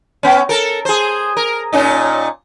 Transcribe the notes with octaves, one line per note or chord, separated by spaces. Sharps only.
B3 C#4
A4 A#4
G#4 C5
A#4
A#2 C#4 D#4